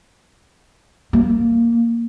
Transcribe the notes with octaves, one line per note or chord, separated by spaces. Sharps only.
A#3